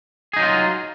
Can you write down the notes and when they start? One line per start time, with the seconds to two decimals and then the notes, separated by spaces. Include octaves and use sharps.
0.33 G#4
0.37 D#4
0.40 F#3
0.43 F4